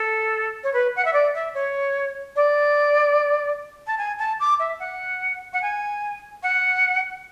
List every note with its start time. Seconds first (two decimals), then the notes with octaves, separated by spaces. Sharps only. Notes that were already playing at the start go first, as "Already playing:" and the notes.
Already playing: A4
0.63 C#5
0.73 B4
0.96 F#5
1.05 E5
1.13 D5
1.34 E5
1.54 C#5
2.36 D5
3.87 A5
3.98 G#5
4.19 A5
4.40 D6
4.59 E5
4.79 F#5
5.53 F#5
5.62 G#5
6.43 F#5